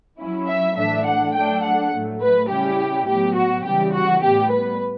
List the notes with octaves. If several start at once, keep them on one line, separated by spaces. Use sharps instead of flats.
F#3 C#4 E4
E5
A2 E3 A3 D4 E5
F#5
F#3 A3 D4 G5
F#5
A2 F#3 A3
B4
C#3 G3 C#4 E4 G4
A2 F#3 B3 G4
F#4
C#3 E3 G3 G4
F#4
A2 G3 B3 G4
B4